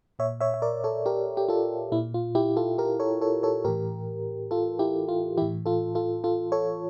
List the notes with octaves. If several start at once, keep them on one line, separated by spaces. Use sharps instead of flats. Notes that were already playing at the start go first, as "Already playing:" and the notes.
A#2 C#5 E5
C#5 E5
E5
A#4 D5
A4 C#5
G4 A#4
G4
F4 A4
A#2 E4
F4
E4 G4
F4 A4
G4 A#4
A4 C#5
A4 C#5
A4 C#5
A2 E3 G4 A#4
F4 A4
E4 G4
F4
A2 E3 E4 G4
F4 A4
F4 A4
F4 A4
A4 C#5